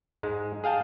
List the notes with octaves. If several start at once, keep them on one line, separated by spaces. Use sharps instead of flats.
G#2 G#3
G#4 F5 G5 A5